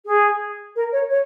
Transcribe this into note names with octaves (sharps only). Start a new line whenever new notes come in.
G#4
A#4
C#5
C#5